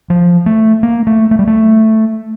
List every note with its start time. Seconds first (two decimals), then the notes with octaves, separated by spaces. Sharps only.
0.10 F3
0.46 A3
0.83 A#3
1.07 A3
1.31 A3
1.39 G3
1.47 A3